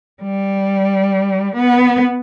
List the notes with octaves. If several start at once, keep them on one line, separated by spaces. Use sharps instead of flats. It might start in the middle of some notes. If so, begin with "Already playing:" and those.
G3
B3